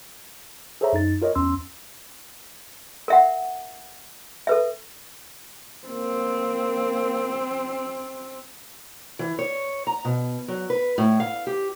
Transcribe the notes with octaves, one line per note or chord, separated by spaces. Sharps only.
G#4 A4 C5 C#5 E5 A#5
F#2 D#4 A6
F4 A#4 C#5 D#5
E2 C#4 C6 E6
A#4 E5 F#5
A4 B4 E5
A#3 C4
E3
C#5
A#5
B2
F#3
B4
A2
F5
G4